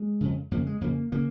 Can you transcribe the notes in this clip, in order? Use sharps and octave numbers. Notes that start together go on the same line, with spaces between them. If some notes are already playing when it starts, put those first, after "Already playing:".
Already playing: G#3
F2 C#3
F2 C#3 A#3
G#3
F2 C#3 A#3
C#3 A#3